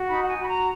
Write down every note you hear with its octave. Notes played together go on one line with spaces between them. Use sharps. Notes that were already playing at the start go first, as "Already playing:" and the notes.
Already playing: F#4
D#4 B5
F#5
G#5
F#4
B5
A#5